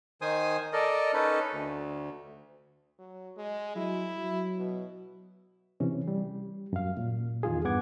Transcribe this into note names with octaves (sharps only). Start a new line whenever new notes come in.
D#3 C5 G#5 D#6
A4 A#4 D5 D#5
C#4 D#4 A4 B4
D2
F#3
G#3
F#3 E4
F#3
B2
C3 E3 C#4
G3
F#2 F5
A#2
E2 D#3 F4 G#4
G2 B3 F#5 D6 G#6